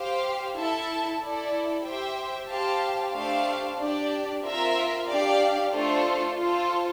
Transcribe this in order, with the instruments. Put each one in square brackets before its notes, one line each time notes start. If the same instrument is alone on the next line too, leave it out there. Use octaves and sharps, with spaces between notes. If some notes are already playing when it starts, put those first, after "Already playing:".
Already playing: [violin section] G4 C5 F5
E4 A4 E5 A5
E4 A4 D5
G4 C5 E5 G5
G4 C5 F5 A5
A3 D4 G4 C5 F5
D4 G4 D5
C4 F4 A#4 E5
D4 G4 D5 F5
A3 D4 F4 A4 C5
F4 A4 C5